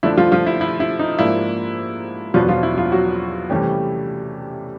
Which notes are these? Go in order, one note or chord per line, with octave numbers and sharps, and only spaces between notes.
D3 F3 A3 D4 E4
F3 F4
F3 F4
E4
E4
E4
D#4
G#2 F3 A#3 D4 E4
E2 B2 F3 F#3 B3 D4 F4
F3 F4
E4
F3 F4
F#3 F#4
C3 E3 G3 A3 C#4 G4